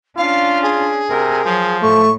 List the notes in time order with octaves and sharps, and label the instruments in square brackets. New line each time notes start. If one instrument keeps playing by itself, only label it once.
[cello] C#4 D4 [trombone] F4 [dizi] F5
[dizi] G#4
[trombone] C3 [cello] A#4
[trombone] F3 [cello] F#3
[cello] A2 [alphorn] A3 [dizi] C#6